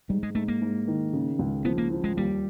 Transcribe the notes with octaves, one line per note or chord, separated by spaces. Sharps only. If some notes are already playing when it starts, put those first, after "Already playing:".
G#2 G3
G#3
G#2 A3
A#3
G#2
D#3
C#3
C#2
F3 B3
A#3
F3
G#3
D#2 G3